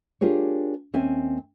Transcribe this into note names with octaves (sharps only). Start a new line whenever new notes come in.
D4 F4 G4 G#4 A#4 C#5
D#2 C4 C#4 E5 G#5